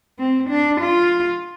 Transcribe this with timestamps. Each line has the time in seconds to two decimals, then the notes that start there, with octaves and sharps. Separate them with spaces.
0.19 C4
0.50 D4
0.81 F4